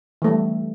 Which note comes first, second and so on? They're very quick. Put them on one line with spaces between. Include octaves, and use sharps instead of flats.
E3 A3 G3